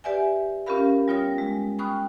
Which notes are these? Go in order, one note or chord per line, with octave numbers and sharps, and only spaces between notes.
G4 B4 D5 E5 F#5 G#5
C#4 F4 G4 A#4 F5 B5
G3 B3 F4 C#5 D#6 A#6
G#3
G5 B5 C#6 D#6 F6 F#6